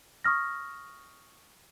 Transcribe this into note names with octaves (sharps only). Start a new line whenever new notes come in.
C#6 D#6 F6 A#6